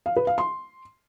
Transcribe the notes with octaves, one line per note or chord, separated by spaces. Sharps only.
F5
B4
F5
C6